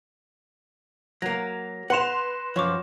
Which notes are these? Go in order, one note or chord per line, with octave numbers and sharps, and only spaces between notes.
F#3 A#3 A#6
B4 F#5 C6 F#6 C#7 E7 F7
F#2 F3 C#5 C#6 D6